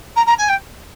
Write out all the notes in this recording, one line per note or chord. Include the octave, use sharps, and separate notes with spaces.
A#5
A#5
G#5
G5